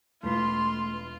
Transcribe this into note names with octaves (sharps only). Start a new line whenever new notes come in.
E1 A3 F4 B4 C6